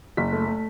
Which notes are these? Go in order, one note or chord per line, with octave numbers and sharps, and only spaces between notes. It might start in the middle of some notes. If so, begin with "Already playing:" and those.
F#1 B6
A3
A3